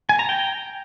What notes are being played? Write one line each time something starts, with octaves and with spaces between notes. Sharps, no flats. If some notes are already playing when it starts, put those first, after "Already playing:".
G#5
A#5
G5